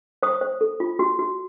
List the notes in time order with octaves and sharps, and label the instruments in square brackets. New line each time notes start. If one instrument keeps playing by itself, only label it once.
[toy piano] C5 D#6
C5
A4
F4
F#4
F#4